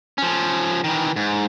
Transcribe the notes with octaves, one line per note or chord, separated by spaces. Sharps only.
F3 C#4
D#3 E3
G#2